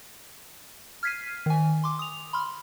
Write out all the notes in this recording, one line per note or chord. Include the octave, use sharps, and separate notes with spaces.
F6 G#6 B6 C7 D#7
D#3 G#5
C6 D6
D#6 F7
B5 C6 F6